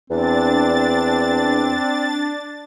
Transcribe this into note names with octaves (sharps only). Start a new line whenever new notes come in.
E2 C4 D4 A6